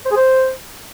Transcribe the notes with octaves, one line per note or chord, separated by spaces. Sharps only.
C5
G#4
C5